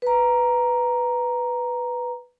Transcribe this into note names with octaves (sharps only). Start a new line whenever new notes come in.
B4 A#5